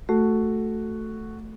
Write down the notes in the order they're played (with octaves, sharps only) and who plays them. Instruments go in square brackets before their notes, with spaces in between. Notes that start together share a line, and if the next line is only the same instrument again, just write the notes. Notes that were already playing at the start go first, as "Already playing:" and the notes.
[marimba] A3 [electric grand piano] F#4 A4